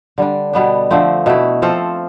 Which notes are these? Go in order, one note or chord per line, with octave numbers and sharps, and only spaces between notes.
D3 G3 D4
B2 G3 B3 D4
D3 F3 A3 C4
B2 A3 E4
F3 C4 F4 A4